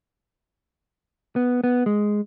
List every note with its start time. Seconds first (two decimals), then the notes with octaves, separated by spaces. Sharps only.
1.36 B3
1.64 B3
1.86 G#3